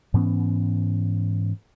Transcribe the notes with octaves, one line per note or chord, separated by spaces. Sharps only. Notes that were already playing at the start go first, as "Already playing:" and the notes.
G#2 E3 B3 C#4